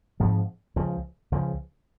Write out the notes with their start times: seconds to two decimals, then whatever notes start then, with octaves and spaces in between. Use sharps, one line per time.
0.20 G#2 F3 C4
0.76 C#2 C#3 F3
1.32 C#2 C#3 F3